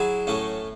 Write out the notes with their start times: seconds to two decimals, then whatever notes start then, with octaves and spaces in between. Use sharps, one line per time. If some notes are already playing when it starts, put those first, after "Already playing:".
Already playing: F#3 E4 G#4
0.27 A2 A3 C#4